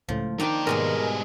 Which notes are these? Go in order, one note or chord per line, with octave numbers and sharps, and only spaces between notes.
C#2 A2 F3
D#3 A#3 D4 D#4 A#4 G5 C6
G#2 B2 G3 G#3 G#4 A#4